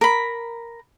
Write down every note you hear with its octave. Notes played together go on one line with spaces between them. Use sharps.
A#4 B5